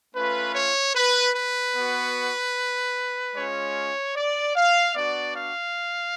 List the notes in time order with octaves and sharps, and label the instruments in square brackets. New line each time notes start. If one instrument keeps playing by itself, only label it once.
[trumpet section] A3 C#4 F4 B4
C#5
B4
B4
B3 F#4
G#3 C#4 F4 C#5
D5
F5
B3 D4 F#4 D5
F5